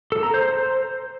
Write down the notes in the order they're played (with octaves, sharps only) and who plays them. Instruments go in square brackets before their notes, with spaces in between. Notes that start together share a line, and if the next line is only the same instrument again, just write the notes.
[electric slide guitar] A4
A#5
C5